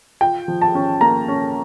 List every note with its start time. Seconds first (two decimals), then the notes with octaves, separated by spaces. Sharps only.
0.21 F4 G5
0.48 F3
0.62 A5
0.75 C#4
1.01 A#3 A#5
1.28 C#4